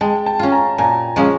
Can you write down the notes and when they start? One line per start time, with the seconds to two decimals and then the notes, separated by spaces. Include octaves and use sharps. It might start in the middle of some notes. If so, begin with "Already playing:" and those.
0.01 G#3 G5 A5
0.26 G5 A5
0.39 C#4 F4
0.52 G#5 A#5
0.78 A#2 G#5 A#5
1.16 F3 G#3 C#4